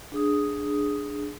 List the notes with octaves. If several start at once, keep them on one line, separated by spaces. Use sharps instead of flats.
D4 G#4 D#6